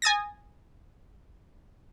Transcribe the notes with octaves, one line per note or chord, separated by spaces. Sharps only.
G#5 D#6 A6 A#6